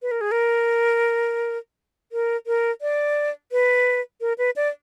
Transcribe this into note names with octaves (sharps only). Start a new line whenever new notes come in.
B4
A#4
G#4
A#4
A#4
A#4
D5
B4
A#4
B4
D5